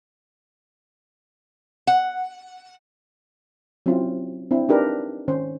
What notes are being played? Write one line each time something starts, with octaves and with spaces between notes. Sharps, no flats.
F#5
F#3 C4 C#4 E4 F4
C4 D4 E4
D4 D#4 G4 G#4 A#4 B4
D#3 C#4 C5